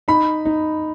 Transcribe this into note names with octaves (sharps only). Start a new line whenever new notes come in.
D#4 B5
D#4